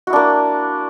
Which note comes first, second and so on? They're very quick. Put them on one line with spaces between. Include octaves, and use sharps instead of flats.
F#4 E4 D4 A#3